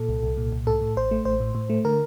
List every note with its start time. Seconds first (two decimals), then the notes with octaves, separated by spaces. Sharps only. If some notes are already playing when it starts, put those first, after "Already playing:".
Already playing: A#2 A4
0.09 C2
0.23 C2
0.37 A#2
0.52 C2
0.67 A2 A4
0.81 A2
0.97 A1 C5
1.11 A3
1.25 A1 C5
1.40 A2
1.55 A2
1.70 A3
1.85 D3 A#4